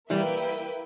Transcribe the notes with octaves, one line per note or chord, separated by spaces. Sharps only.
E3 G3 A#3 E4 B4 E5 G5